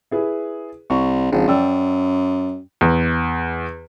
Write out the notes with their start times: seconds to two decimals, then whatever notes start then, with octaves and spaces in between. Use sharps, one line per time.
0.11 E4 G#4 B4
0.90 C2 C#6
1.32 G#1 C#3 F3 G#3
1.48 F#2 D5 G5 E6
2.81 E2